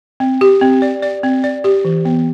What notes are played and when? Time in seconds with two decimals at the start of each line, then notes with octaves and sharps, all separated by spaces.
0.20 C4
0.41 G4
0.62 C4
0.82 D5
1.02 D5
1.23 C4
1.44 D5
1.64 G4
1.85 E3
2.05 B3